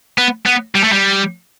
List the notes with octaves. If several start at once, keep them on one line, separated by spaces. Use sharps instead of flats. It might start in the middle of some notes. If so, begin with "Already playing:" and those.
B3
B3
G3
A3
G3